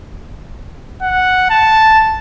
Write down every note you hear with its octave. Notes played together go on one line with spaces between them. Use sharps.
F#5
A5